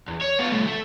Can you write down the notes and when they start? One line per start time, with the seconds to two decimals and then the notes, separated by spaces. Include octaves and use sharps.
0.08 E2
0.21 C#5
0.39 B3 F4
0.52 C2 A3
0.67 A3